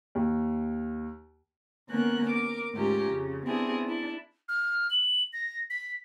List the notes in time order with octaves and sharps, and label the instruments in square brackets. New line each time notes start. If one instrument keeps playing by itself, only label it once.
[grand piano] D#2
[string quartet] D3 A#3 B3 C#4 A#4 F#6
A#4 D6
D2 G#2 C#4 F4 G4 A#5
F2 C#3
B3 C4 D4 E4 G#4
D4 E4
[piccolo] F6
F#7
A#6
B6